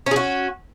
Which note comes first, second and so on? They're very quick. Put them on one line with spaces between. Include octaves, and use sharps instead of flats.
C#4 G#4 F#4